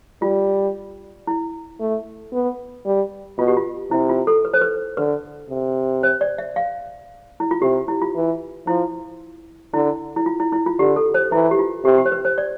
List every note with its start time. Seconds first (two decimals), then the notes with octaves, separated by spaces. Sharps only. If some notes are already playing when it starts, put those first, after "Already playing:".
0.22 G3 F4
1.27 E4
1.80 A3
2.33 B3
2.86 G3
3.38 B2 F4
3.48 G4
3.57 F4
3.91 C3 E4
4.09 F4
4.27 A4
4.45 B4
4.53 C5
4.62 B4
4.97 D3 B4
5.50 C3
6.03 C5
6.21 D5
6.38 E5
6.56 F5
7.40 E4
7.51 F4
7.62 C3 G4
7.88 E4
8.02 F4
8.15 E3
8.67 F3 E4
9.74 D3 E4
10.16 E4
10.26 F4
10.40 E4
10.52 E4
10.66 F4
10.79 D3 G4
10.96 A4
11.14 C5
11.32 E3 E4
11.51 G4
11.59 F4
11.85 C3 G4
11.98 G4
12.06 C5
12.12 B4
12.25 C5
12.38 D5